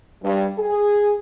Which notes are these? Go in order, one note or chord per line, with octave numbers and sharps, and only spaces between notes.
G2
G#4